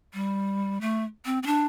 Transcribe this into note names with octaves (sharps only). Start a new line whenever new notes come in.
G3
A3
C4
C4
D4